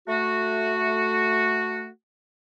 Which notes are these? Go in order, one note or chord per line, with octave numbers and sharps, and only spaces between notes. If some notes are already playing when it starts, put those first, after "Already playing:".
A3 F#4